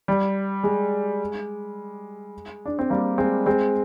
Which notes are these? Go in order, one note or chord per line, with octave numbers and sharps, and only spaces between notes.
G3
G#3
D4
C4
G3 A#3
G#3 C4
G#3 C4